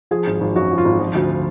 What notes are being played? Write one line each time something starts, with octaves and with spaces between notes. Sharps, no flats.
F3 G#4
G#1
G#1
F#2 F#4
F3
F4
G#1
F3
D2